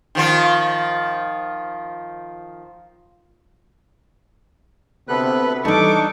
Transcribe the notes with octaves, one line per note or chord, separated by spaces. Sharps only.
D#3 F3 F4
D2 C3 B3 A4 B4 F#6
E3 G3 D4 D#4 A4 C#6 D6